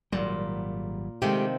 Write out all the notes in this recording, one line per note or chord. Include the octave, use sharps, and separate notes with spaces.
G#1 A#2 F#3 G3
C3 D#3 F3 G#3 A3 G4